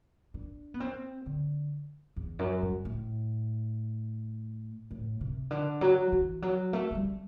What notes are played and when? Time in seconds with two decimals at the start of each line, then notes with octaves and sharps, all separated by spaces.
0.34 D4
0.74 B3
0.80 C4
1.26 D3
2.16 E2
2.39 F#2
2.62 G2
2.85 A2
4.91 A2
5.21 C3
5.51 D3
5.81 F#3
6.12 E3
6.42 F#3
6.73 A3
6.91 A3
6.95 G3